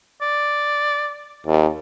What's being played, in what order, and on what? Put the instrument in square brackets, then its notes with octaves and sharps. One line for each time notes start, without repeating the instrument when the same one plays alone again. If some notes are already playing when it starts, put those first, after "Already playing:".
[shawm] D5
[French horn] D#2